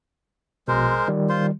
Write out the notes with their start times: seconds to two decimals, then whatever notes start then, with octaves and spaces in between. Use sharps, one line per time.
0.68 A#1 B2 G#3 A#4 C5
1.08 D#3 G3
1.29 F4 C5 C6